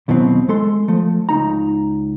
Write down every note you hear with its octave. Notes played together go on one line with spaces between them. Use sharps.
D#2 B2 E3 F#3 C4
G#3 A4 C6
F3 A3
C#2 D#4 A#5